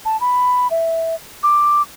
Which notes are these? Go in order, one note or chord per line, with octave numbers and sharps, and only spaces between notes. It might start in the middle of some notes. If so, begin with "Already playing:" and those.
A5
B5
E5
D6